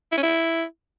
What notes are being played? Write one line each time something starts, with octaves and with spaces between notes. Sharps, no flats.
E4
C#4
E4